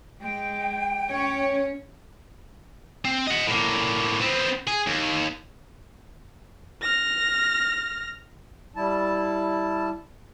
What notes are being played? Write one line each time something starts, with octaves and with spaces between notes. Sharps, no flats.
G#3 G5
C#4 C#5
C4
D#5 F#5
A2 A#3
B3 C4
G#4
D#2
F6 A#6
G3 E4 A5